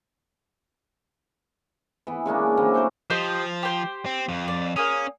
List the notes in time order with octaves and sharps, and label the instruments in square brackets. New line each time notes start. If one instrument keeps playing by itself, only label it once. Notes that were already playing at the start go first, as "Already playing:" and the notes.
[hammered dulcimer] E3 B3
C#3 G#3 A#3 D4
E3 F#3 A#3 C4
A3 A#4 C5 F#5
[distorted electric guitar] F3 [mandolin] G4 C5 D#5
[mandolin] G4 C5
[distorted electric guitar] C4
F2
[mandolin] D5
[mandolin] A#3 G#4 D#6 [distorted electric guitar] C#4